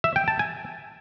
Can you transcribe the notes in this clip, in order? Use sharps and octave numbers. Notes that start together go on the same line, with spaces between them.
E5
G5
A5
G#5